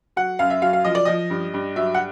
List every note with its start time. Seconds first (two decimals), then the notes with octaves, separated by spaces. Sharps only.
0.16 F#3 F#5
0.39 F#2 F5
0.50 E5
0.62 F#3 F5
0.73 F5
0.84 F3 D#5
0.95 D5
1.05 F3 D#5
1.30 G2
1.54 G2
1.76 F#3 E5
1.94 F#5